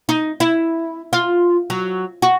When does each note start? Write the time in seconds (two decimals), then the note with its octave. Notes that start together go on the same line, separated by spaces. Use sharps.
0.09 D#4
0.40 E4
1.13 F4
1.70 F#3
2.22 F#4